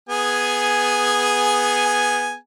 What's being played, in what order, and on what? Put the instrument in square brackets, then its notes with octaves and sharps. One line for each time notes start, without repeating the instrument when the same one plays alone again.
[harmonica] B3 G#4 G#5